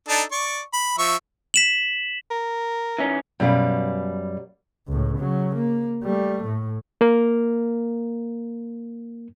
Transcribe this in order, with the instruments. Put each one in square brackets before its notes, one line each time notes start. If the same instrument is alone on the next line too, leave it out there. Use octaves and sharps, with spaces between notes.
[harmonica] D4 D#4 A4
D5 C#6
B5
F3 E5 C#6
[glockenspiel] B6 E7 F#7
[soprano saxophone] A#4
[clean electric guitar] E3 C#4 D#4
[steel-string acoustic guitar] F#2 B2 G3 F5
[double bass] C#2 A2
C#3 F#3
A#3
G3 A3
A2
[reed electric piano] A#3 A#4